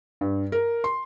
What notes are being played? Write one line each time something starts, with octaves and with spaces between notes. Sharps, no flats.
G2
A#4
C6